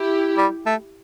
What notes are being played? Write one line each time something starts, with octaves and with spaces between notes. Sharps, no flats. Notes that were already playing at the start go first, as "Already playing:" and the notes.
Already playing: E4 G4
G3
A3